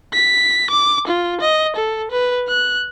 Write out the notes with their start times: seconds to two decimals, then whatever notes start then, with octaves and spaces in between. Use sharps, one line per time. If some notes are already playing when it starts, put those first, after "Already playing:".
0.14 B6
0.70 D6
1.08 F4
1.41 D#5
1.76 A4
2.11 B4
2.49 F#6